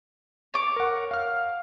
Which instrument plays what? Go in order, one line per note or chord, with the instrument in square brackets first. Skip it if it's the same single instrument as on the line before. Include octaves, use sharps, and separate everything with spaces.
[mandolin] C#5 D6
[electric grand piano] A#4 F#5
F5 F6